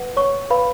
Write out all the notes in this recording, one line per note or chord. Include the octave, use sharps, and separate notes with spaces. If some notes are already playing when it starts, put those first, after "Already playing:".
Already playing: B4 F#5
C#5 C#6
B4 F5 B5